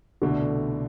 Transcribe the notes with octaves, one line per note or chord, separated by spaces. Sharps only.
C2 B2 D3 A3 D4